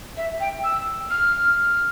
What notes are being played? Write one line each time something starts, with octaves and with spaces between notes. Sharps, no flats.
E5
G5
E6
F6